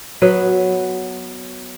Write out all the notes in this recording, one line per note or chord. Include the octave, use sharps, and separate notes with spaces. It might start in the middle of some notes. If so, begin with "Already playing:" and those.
F#3 B3 B4